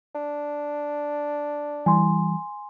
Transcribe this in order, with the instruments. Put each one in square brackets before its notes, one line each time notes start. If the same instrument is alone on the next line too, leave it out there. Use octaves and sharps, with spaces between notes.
[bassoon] D4
[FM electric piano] E3 G3 [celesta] G#5 C6